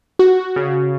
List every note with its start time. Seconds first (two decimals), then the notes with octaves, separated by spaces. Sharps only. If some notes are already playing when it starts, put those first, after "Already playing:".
0.19 F#4
0.56 C#3